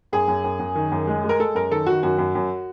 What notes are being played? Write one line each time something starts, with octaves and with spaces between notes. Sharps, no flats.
F#2 G#4
F#2
F#2
F#2
D#3
F#2
G#3
G#3
A#4
G#3 A4
F#2 A#4
D#3 A4
D#3 F#4
F#2 F#4
F#2
F#2